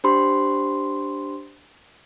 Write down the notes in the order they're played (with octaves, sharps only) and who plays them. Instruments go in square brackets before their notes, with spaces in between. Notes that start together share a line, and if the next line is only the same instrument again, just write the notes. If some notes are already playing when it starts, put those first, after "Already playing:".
[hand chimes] D4 G4 C5 B5 C6